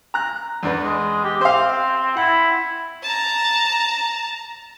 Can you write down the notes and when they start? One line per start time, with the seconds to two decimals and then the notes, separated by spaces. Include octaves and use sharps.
0.14 A#5 F#6
0.63 E2 D4 B4
0.84 G#3
1.24 G4
1.41 C4 C5 F5
2.17 E4 F#5
3.03 A5 A#5